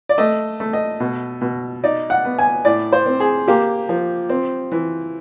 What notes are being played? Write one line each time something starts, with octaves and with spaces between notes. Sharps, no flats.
D5
A3 D#5
A3
D#5
B2
B2
D#4 D5
F#5
B3
G#5
A2 D5
C5
C4
G#4
A#3 G4
F3
C4
E3